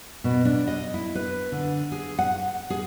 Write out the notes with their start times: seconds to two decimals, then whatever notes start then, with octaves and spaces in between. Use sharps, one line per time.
0.24 B2
0.45 D4
0.68 D#5
0.94 E4
1.15 B4
1.52 D3
1.92 G#4
2.19 F#5
2.70 G#4